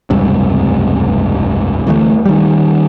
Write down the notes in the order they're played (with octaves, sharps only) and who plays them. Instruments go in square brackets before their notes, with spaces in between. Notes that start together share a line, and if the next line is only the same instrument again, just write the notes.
[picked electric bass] F1 C#2 G2 C3
D2 E3 F#3 A3
D#3 G3